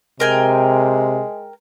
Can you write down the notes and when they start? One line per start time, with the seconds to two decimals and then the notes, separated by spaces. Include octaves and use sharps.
0.20 C3 G#3 A#4 G5 G#5